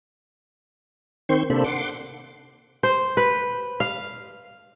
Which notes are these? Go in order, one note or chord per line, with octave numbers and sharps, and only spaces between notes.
D#3 C4 C5 C6 C#6
C3 A#3 D4 A4 C5 B5
F#5 C6 D6
C5
B4
F5